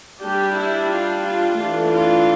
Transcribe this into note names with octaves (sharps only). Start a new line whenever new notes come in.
G3 D4 G4
E4
F4
F4
E3 A3 D4
F4